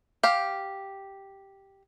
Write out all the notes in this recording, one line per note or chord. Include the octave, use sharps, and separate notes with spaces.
G4 F5